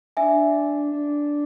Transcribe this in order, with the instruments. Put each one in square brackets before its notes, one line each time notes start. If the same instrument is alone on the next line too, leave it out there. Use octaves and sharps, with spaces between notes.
[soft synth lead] D4 [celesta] E5 G#5
[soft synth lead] D4